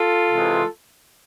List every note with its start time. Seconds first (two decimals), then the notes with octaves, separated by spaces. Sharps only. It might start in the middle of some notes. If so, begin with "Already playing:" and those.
Already playing: F4 A4
0.31 C3 E3 G#3